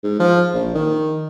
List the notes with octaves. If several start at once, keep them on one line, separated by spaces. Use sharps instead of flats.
G#2
F3
A#1
D#3